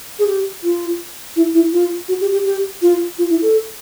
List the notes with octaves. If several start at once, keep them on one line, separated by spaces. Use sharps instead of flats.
G#4
G4
F4
E4
E4
F4
F#4
G4
G4
G4
F4
F4
E4
A4